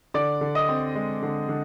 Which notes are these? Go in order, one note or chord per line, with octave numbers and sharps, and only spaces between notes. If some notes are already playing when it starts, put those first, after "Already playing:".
D3 D5 D6
D3
D#5 D#6
C4
G#3
D3
D3